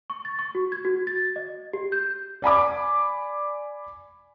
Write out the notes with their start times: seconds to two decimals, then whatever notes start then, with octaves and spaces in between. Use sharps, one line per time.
0.10 C#6
0.25 A6
0.39 C#6
0.55 F#4
0.72 G#6
0.85 F#4
1.07 A6
1.36 D#5
1.73 G4
1.92 G6
2.42 D5 G#5 B5 D6